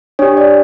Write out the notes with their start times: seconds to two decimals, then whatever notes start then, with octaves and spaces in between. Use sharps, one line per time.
0.19 D4 G4 C#5
0.37 D5